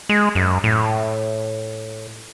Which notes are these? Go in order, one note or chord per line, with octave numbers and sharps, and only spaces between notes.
G#3
F#2
A2